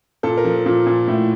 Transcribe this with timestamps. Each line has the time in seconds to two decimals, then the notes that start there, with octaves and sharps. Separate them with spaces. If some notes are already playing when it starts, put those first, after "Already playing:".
0.23 A#2 A4
0.37 A#4
0.45 F3
0.66 A#2
0.86 A#2
1.07 A2